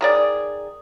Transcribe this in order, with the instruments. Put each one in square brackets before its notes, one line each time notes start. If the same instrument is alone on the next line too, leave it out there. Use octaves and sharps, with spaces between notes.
[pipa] D#3 G#4 D5